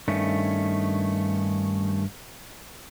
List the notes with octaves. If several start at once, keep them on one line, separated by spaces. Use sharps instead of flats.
G2 D#3 A3 C#4